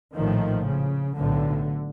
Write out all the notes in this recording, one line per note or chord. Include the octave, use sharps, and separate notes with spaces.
A#1 A2 D#3 F3
C#3
B1 A2 D3